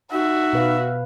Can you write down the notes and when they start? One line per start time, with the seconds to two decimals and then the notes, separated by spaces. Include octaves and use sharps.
0.12 D#4 F#4 E5
0.53 B2 B4 F5